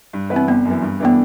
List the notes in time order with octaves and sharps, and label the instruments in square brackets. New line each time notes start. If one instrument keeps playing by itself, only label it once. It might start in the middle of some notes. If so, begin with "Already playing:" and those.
[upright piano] G2
E3 B3 E4 B4
[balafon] C4
[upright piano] G1 [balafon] B3
[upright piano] F#2 E3
G2
[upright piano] E3 A3 D4 [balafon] B3